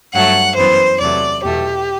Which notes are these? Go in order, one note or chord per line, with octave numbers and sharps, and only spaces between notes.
G2 F#3 A3 F#5
F#2 E3 B3 C5
E2 C3 F#3 A3 D5
E2 B2 A3 G4